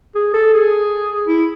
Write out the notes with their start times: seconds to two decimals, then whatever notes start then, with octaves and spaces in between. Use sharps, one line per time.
0.15 G#4
0.34 A4
0.53 G#4
1.27 E4